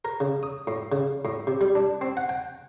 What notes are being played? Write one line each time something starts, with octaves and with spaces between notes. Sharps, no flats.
A#4
C#3
D#6
A2
C#3
A2
C3
G3
D4
C4
F#5
G5